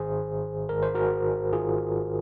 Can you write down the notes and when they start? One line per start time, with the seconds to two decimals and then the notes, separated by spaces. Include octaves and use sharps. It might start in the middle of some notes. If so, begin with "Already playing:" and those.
Already playing: G#1 G#2 D#3 G#4 C5
0.69 G#1 G#2 D#3 A#4
0.83 C5
0.95 F#4 A#4
1.53 G#1 G#2 D#3 F4 G#4